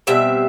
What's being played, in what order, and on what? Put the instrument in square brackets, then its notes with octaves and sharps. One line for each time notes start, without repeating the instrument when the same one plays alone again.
[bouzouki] B2 G3 C4 E5